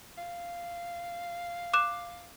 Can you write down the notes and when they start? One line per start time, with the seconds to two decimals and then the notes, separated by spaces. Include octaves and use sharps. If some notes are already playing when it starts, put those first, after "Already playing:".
0.18 F5
1.74 D6 F#6 E7